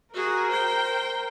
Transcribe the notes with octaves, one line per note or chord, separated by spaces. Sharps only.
F#4 G#4 A#4
C5 G5